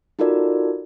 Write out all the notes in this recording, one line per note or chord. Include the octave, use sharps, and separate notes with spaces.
D#4 F4 F#4 A4 A#4 D5